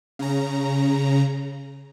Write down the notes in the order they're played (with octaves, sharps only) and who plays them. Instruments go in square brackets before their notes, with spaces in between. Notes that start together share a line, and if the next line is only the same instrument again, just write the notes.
[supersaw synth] C#3 A#5